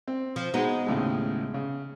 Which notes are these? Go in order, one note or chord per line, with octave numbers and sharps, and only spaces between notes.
C4
F3
G#3 B3 D#4 F#4 G#4
D#2 A2 C#3
C#3